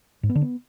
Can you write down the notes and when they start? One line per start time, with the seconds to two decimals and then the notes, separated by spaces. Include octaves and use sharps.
0.23 G#2
0.29 B3
0.35 D3
0.42 B3